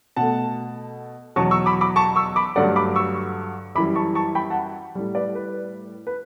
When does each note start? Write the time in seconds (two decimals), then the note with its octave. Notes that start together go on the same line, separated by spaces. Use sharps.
0.16 B2 A3 F#5 A5
1.36 E2 B2 F#3 A5 C#6
1.51 C#6 E6
1.66 B5 D6
1.81 B5 D6
1.96 A5 C#6
2.16 C#6 E6
2.36 B5 D6
2.56 G2 D3 F#3 A3 D5 F#5
2.76 B5 D6
2.96 C#6 E6
3.75 F#2 E3 G3 B5 D6
3.95 A5 C#6
4.15 A5 C#6
4.35 G5 B5
4.50 F#5 A5
4.95 A2 G3
5.15 B4 D5
5.35 B4
6.07 B4